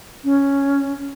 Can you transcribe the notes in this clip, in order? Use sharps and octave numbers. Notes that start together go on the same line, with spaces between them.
C#4